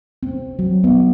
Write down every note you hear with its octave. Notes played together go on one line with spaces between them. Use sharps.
C4
F#3
B3